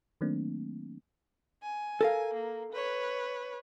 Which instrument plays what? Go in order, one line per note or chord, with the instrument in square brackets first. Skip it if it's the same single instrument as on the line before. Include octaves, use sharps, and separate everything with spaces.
[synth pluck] D#3 F#3 A3 A#3 C4 D4
[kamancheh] G#5
[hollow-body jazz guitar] A4 A#4 F5
[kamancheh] A#3
B4 C#5